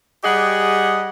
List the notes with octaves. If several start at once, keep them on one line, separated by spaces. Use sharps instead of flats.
G3 G4 G#4 D#5 F#5